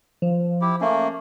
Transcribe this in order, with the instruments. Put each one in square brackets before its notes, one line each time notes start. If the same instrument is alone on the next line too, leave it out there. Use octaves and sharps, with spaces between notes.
[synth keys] F3
[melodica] E4 G4
[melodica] A3 A#3 [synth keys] C#4